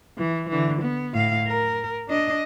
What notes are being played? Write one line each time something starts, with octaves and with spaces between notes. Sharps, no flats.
E3
D3 E3
B3
A2 F5
A#4
D4 D#5